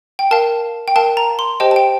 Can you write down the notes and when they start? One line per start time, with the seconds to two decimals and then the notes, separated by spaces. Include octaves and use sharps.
0.19 G5
0.31 A#4 F5 A5
0.88 G5
0.96 A#4 F5 A5
1.17 A#5
1.39 C6
1.60 G4 C5 D#5 G5 A5
1.71 A5
1.76 G5